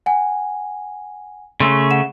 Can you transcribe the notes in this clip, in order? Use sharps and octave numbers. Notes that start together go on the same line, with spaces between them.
F#5 G#5
C#3 A3 C6
F#5 E7